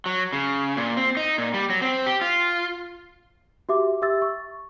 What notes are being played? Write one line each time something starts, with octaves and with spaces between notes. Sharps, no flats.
F#3
C#3
A#2
C4
D#4
A#2
G3
F#3
C4
G4
F4
F#4 G4 E5 D6
G4 E5 E6 A6
C#6